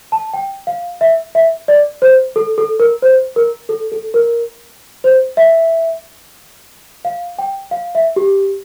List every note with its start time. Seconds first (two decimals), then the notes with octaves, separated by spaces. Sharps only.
0.12 A5
0.34 G5
0.67 F5
1.01 E5
1.35 E5
1.68 D5
2.02 C5
2.36 A4
2.58 A4
2.80 A#4
3.02 C5
3.36 A#4
3.69 A4
3.92 A4
4.14 A#4
5.04 C5
5.37 E5
7.05 F5
7.39 G5
7.71 F5
7.95 E5
8.16 G4